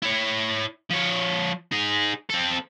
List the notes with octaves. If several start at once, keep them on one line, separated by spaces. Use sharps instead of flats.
E4 C#5
F3 C#5
D#4 G#4
C4 A4